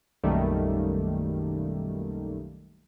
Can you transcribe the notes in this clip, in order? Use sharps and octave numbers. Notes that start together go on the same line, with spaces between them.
B1 F#2 D#3 G3 A3 A#3